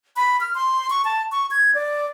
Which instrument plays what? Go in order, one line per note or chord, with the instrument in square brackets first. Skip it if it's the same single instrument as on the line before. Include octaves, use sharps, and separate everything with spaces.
[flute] B5
F6
C6
C#6
A5
C#6
G#6
D5